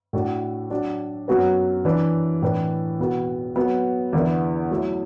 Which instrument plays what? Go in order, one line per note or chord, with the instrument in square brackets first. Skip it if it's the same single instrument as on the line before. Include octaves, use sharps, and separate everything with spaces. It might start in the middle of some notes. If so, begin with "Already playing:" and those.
[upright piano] A2 A3 D4 F#4
F#3 D4 F#4
F#2 F#3 B3 F#4 B4
E3 D4 B4
A2 E3 D4 B4
E2 B2 B3 F#4
F#3 B3 F#4
E2 D3 B3 E4
F#3 A3 E4